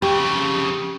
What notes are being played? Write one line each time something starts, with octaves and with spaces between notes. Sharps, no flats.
F2 C#3 G4